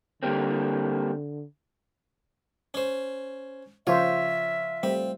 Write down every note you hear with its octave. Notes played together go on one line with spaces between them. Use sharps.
D3 G3 A#3 C4
C#4 C5
C#3 F3 F4 C5 C#5 E5
G3 A3 C4